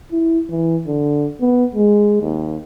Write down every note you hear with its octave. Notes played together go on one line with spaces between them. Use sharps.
E4
E3
D3
B3
G#3
D#2